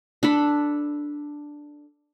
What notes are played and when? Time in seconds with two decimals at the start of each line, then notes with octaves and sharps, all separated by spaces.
0.23 D4 A4 B5